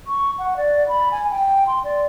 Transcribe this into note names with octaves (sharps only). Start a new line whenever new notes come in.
C#6
F#5
D5
B5
G#5
G5
C6
D5